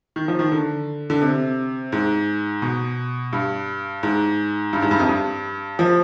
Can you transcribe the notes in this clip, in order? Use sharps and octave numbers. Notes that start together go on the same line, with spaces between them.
D#3
F3
D#3
D3
D3
C3
G#2
B2
G2
G#2
G2
G#2
G2
F2
G2
F3